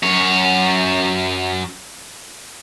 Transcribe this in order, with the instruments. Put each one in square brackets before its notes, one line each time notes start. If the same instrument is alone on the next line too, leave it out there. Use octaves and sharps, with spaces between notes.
[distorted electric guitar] F#2 C#5